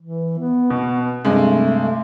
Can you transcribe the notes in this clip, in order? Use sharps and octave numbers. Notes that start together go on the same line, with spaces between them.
E3
B3
B2
G2 C3 G#3 A3